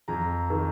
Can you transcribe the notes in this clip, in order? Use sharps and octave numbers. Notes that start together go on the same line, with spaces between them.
F2 A#5
D#3